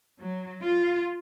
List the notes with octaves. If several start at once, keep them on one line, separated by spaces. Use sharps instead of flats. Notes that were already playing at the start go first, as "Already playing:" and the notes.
F#3
F4